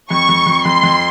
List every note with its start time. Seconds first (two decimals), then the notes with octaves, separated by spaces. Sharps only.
0.10 F2 C#6
0.29 F2
0.46 F2
0.65 F2 C6
0.83 F2